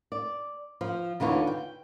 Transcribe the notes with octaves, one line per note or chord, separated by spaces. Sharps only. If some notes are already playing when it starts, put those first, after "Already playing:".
D5
F3
D#2 D3 E3 F4 C#5
G5